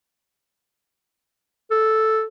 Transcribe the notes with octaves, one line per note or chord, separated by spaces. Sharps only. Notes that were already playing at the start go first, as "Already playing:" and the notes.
A4